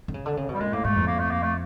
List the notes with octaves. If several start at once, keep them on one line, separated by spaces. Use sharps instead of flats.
D3
C#3
D3
C#3
B2
G3
A#2 G#3
A2 A#3
G#2 A3
F2
A#3
A3
A#3
A3